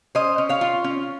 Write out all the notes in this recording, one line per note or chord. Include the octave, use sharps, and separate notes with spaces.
C#4 C5 D#5
C#4
C#5 F5
F4
C#4